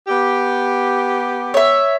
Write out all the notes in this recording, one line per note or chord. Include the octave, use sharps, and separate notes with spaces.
B3 G4
C#5 E5